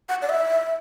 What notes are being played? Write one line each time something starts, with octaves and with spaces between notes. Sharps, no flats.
F#5
D5
E5